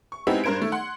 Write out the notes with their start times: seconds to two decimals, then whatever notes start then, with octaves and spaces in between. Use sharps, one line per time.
0.12 C#6
0.27 G#3 B3 C4 D#4 E4 G4
0.44 G2 A#4 C5 G#6 D7
0.60 D#3 A3
0.72 F#5 C6